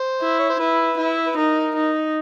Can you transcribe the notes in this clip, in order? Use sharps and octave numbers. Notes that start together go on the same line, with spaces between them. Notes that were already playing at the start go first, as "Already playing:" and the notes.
Already playing: C5
E4
C#5
C5
E4 B4
E4
B4
D#4 A#4
D#4